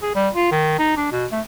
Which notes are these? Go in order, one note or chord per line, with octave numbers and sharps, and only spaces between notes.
G#4
G3
F4
D#3
D#4
D4
B2
A3